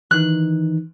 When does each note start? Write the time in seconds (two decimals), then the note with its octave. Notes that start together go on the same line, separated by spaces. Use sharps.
0.11 D#3 E3 D#4 F#6